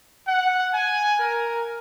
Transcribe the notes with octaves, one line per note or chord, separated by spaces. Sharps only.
F#5
G#5
A#4